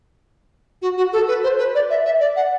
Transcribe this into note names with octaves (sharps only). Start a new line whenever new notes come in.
F#4
F#4
A4
B4
C5
B4
D5
E5
E5
D5
F#5